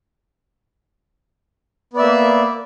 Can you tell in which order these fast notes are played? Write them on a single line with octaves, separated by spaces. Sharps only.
B3 D5 E5 A#3